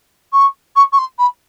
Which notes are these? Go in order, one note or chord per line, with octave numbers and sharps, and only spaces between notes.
C#6
C#6
C#6
C6
B5